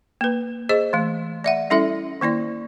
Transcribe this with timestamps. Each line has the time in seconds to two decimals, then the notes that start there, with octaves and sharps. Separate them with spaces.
0.21 A#3 B4
0.69 G#4 C5 D#5
0.93 E3 A3
1.44 D5 E5 F#5
1.70 G3 C#4 E4 A4 E5
2.21 D#3 A#3 E4 D5